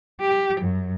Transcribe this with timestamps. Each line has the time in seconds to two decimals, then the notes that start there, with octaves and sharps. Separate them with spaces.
0.21 G4
0.61 F#2